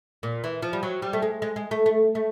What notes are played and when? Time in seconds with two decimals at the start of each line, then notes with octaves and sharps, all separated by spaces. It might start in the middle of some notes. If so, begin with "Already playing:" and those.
0.23 A#2
0.44 E3
0.62 F3
0.73 G3
0.83 F#3
1.02 G3
1.13 A3
1.22 G#3
1.42 G#3
1.56 G#3
1.71 A3
1.86 A3
2.15 A3